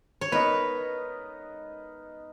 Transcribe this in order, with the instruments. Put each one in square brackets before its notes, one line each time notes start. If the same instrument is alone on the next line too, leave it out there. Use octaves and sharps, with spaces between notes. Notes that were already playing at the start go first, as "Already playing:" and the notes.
[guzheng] C#5
[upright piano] B3 D#4 A#4 D#5 [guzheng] B4